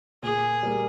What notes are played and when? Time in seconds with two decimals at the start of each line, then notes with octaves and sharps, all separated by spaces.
0.23 A#2 G#4
0.63 G3 A#3